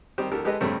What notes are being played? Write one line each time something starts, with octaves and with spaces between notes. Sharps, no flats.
D#3 G3 C4 G4
D2 G4 A4 A#4
G#3 G4 A4 B4 D#5
E2 G2 C#3 A3 C4